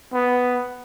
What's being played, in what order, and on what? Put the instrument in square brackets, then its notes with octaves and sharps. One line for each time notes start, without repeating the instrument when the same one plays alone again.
[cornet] B3